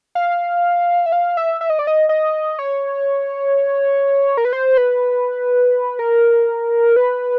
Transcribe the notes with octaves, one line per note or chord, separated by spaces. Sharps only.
F5
E5
F5
E5
E5
D#5
D5
D#5
D#5
C#5
A#4
B4
C5
B4
A#4
B4